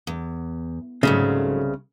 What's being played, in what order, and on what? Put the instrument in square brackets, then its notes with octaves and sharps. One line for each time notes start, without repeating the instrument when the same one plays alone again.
[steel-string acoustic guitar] E2
[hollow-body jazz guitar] C2 C#3 [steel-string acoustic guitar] G#2 F#3 A3